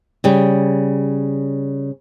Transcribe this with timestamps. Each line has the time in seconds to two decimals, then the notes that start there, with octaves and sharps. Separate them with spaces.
0.24 C#3 G3